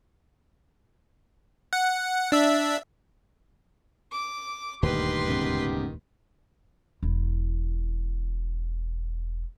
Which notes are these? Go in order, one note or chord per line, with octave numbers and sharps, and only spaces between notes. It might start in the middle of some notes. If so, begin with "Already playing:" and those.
F#5
D4 E5
D6
D#1 D2 G2 D#3 G4 B4 C6
G#2 C#3 B3
E1 E4